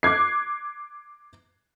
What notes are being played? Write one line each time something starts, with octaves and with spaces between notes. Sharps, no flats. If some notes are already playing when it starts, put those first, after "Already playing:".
D6 F#6 G#6 C7